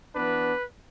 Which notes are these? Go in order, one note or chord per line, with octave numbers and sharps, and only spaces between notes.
E3 B3 D4 B4